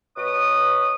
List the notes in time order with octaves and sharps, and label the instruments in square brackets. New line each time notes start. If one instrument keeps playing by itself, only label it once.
[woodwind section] B2 B4 C#5 D#6